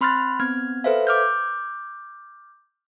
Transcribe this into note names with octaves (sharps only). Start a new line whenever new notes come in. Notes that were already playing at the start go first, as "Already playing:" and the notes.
C4 B5 C6 F6 F#6 A6
B3 C4 F6 G#6
A4 B4 C5 E5 F5
D6 F6 G6